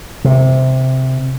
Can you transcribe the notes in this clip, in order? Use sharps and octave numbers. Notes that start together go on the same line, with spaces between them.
C3